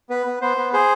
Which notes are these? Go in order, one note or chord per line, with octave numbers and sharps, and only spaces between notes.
B3 B4
B3
B3 C5
B3
G#4 C5